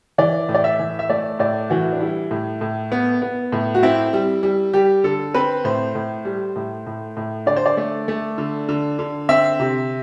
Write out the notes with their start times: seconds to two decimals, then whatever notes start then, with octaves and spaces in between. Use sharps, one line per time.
0.18 E3 D5
0.49 A2
0.54 D5
0.64 E5
0.79 E3
0.99 E5
1.10 A3 D5
1.39 A2 D5
1.70 E3 F#4
1.93 D4
2.00 G3 E4
2.31 A2
2.61 A2
2.92 B3
3.22 B3
3.52 A2
3.75 F#4
3.83 C4 E4
4.13 G3
4.43 G3
4.73 G3 G4
5.04 D3 A4
5.34 C4 B4
5.65 A2 C5
5.95 A2
6.25 G3
6.56 A2
6.87 A2
7.17 A2
7.46 D3 D5
7.56 C5
7.66 D5
7.77 A3
8.08 A3
8.38 D3
8.69 D3
8.99 D3
9.29 C4 E5
9.60 C3